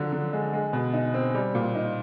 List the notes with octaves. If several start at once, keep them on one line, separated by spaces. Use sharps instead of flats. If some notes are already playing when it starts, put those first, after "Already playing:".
Already playing: D3 F3 F#3
D3
G#3
G#3
B2
D#4
C4
G3
A#2
D#4